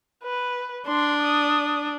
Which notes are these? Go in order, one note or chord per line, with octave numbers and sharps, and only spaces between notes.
B4
D4 C6
D#6